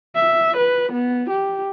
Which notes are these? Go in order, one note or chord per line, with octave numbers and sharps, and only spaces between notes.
E5
B4
B3
G4